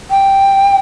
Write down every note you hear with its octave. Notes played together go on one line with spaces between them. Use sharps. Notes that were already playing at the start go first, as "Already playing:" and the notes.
G5